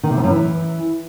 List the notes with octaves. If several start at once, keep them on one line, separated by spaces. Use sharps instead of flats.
D#3
C3
F2
F#2
E3